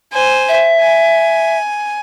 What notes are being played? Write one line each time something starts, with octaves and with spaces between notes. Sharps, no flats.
C5 G#5
E5
G#5